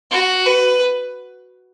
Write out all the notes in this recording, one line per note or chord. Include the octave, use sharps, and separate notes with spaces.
F#4
B4